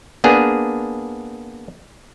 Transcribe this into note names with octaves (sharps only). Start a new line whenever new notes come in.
A#3 B3 D4 G#4